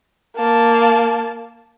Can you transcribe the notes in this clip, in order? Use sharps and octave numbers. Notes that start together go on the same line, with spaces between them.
A#3 A5